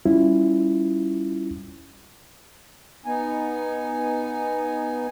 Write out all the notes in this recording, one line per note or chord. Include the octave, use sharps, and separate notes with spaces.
G3 C#4 E4 F4
B3 D#4 G#5